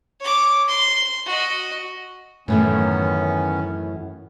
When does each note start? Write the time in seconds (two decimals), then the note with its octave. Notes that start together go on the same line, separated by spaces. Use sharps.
0.20 C#5 D6
0.68 C6
1.26 F#4 D#5
2.48 F#2 A2 D#3 E3 B3 C#4 A4